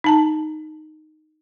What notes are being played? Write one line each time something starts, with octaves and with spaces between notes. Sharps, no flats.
D#4 A5 A#5